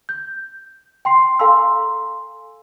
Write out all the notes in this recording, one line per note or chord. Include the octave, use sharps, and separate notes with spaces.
G6
G5 C6 C7
A4 F5 G#5 A#5 C6 E6